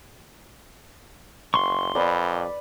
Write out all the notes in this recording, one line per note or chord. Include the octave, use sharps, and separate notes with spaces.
F#1 C6 C#6
F2 B4 D5